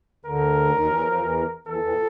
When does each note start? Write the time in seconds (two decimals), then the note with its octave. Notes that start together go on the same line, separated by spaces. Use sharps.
0.25 D2 D3 A#4
0.73 D#2 D#3
0.88 E2 E3
1.05 F2 F3
1.20 E2 E3
1.67 E2 E3 A4
1.79 E2 E3
1.91 A#2